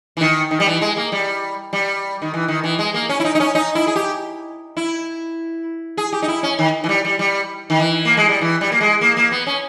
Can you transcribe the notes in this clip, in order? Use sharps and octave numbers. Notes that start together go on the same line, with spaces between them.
E3
D#3
D#3
G3
E3
G#3
A#3
G3
G3
D#3
E3
D#3
E3
G#3
A#3
C#4
E4
D#4
D#4
C#4
D#4
E4
G#4
G4
E4
G#4
G4
D#4
E4
C#4
D#3
E3
G3
G3
G3
D#3
E3
A#3
G#3
G3
E3
G3
A#3
G#3
A#3
A#3
B3
C#4